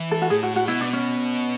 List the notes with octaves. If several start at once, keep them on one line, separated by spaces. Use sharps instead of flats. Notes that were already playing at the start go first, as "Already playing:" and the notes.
Already playing: E3
A4
F#4
A2 G#4
F#4
F#4
B2 E4
D4
C#4